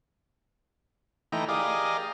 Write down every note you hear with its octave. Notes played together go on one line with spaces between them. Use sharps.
E3 A3 D#4 G5 A#5
G4 G#4 A#4 D5 D#5 F5